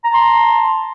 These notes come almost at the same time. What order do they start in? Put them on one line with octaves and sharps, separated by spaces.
A#5 A5 C6